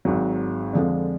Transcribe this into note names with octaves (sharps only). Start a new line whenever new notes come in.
G#1 G#2 F#3
F2 D3 F3 G#3 D4